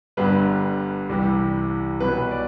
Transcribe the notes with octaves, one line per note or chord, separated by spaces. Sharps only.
G1 G2 D3 G3 B4
C2 C3 E3 G3
B1 B2 F#3 B4
D5